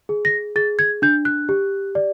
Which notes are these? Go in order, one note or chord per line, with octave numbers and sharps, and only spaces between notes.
G#4
A#6
G#4 A6
G#6
D4 G6
F#6
G4
D5